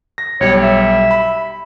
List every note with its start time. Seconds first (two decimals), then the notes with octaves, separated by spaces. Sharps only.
0.18 A#6
0.41 B1 G3 C#5
0.62 E5
1.11 B5